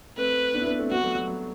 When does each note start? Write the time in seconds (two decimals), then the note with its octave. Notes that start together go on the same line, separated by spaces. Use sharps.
0.17 A3 C4 B4
0.54 B3 D4
0.61 E4
0.67 B3 D4
0.78 A3 C4
0.91 G3 B3 F#4
1.04 F#3 A3
1.15 F#3
1.27 F#3